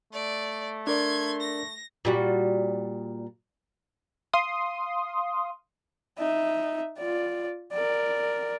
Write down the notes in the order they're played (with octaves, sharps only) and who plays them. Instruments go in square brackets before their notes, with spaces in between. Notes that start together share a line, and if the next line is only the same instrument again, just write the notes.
[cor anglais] A3 [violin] D5
[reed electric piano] D4 A#4 D5 [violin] C6 G#6
[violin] A#6
[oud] A#2 G3 F#4
[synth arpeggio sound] F5 C6 D#6
[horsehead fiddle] D#4 E5
F4 D5
A#4 D5